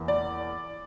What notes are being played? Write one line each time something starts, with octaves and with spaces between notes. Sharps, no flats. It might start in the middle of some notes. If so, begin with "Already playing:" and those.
Already playing: E2 E3 A#3
D5